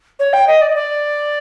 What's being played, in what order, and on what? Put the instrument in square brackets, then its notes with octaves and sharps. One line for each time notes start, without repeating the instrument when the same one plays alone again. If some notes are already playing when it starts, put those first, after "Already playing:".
[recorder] C#5
G5
D#5
D5
D#5
D5